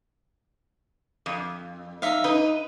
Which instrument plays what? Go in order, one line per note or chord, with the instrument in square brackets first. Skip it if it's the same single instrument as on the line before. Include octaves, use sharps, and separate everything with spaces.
[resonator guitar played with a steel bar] F2
[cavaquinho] D#4 E5 F5
[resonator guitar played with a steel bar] D#4 [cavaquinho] B4